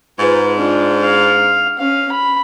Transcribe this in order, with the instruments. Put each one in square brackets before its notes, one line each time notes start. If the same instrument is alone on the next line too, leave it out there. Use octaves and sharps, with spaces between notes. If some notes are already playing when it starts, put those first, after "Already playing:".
[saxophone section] G#2 [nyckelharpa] F4 B4
[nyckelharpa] D4 F4
F5
C#4 F5
B5